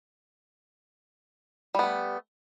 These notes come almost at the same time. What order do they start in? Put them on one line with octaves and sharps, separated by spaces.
G3 B3 A3